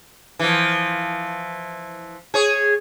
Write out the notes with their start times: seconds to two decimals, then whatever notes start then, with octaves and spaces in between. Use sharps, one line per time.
0.39 E3 F3
2.34 G#4 C#5